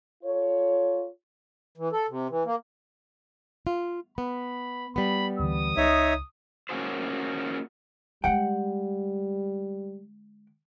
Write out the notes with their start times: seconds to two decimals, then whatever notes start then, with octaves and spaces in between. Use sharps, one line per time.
0.24 F4 A4 C#5
1.78 E3
1.92 A4
2.08 C3
2.30 E3
2.45 A#3
3.67 F4
4.18 B3 B5
4.96 G3 B3 B5
5.39 D2 D3 E3 D#6
5.77 C#2 D#4 C#5 E5
6.69 A#3 C#4 F4 F#4 G#4 C5
8.24 D3 G3 G#3 F#5 G5